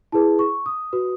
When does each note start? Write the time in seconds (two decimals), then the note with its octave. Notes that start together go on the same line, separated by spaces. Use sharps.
0.12 E4 G#4 B4 A5
0.39 C#6
0.66 D#6
0.93 F#4 B4